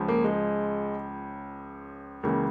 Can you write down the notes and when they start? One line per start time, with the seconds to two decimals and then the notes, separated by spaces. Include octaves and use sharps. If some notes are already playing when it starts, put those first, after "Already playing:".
Already playing: C#2 C#3 F3
0.08 A#3
0.24 G#3
2.23 C#2 C#3 E3 A#3